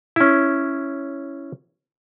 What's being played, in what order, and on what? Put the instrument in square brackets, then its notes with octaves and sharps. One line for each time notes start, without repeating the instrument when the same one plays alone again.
[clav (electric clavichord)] C#4 E4